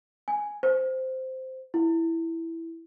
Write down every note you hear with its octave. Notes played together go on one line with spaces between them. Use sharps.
G#5
C5
E4